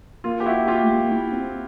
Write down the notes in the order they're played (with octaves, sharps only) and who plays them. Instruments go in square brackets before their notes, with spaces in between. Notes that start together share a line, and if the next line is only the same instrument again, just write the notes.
[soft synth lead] A#3 [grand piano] F4
[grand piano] G4
E4 F#4
F4 G4
[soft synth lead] A3
A#3
E4
C4